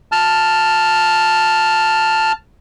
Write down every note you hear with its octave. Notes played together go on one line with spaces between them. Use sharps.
A5 F6